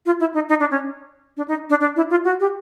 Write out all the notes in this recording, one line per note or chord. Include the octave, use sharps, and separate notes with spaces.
F4
E4
D#4
D#4
D4
C#4
D4
D#4
D4
D4
E4
F4
F#4
G4